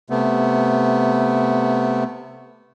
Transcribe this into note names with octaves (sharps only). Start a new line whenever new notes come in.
C3 A3 B3